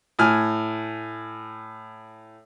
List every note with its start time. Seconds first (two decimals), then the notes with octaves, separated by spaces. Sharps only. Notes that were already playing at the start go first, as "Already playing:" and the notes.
0.19 A2 G#5 F6